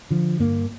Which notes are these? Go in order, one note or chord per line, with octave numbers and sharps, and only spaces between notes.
D3 F3
G2 A#3